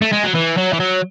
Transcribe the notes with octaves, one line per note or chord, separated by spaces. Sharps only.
A3
G#3
F#3
E3
F#3
E3
F#3